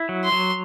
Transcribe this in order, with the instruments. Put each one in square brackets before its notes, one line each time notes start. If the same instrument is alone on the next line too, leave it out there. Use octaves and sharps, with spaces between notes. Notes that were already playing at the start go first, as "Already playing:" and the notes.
Already playing: [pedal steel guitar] E4
F#3
[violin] C6
[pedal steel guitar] F#3